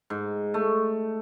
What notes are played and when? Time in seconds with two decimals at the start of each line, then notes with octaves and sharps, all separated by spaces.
0.10 G#2
0.54 A3